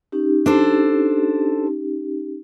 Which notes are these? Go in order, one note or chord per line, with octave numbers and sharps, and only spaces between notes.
C#4 D#4 G4
D4 A4 C5